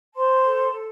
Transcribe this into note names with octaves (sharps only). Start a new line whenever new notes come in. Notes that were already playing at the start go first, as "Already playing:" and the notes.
C5 A5 C6
A4
A4